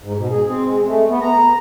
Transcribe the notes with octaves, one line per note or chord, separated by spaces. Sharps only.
G#2
B2
G#4
C4
G#3
A3
B3
A#5